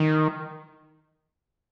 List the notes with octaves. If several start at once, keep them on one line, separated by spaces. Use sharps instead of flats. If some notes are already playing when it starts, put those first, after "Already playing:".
Already playing: D#3